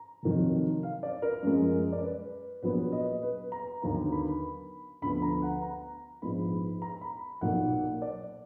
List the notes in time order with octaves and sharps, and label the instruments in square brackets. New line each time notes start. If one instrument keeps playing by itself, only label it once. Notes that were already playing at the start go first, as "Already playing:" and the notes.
Already playing: [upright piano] A#5
F1 F2 D#3 F#3
F5
D5
A#4
F#2 F3 G#3
D5
B4
A#1 A#2 F#3 B3 B4
D#5
B4
A#5
D#2 D3 F#3 B3 A#5
B5
D2 D3 F3 B3 B5
A#5
F#5
A#5
A#1 G#2 F3 B3 B5
A#5
B5
B1 A#2 F#3 A#3 F#5
D5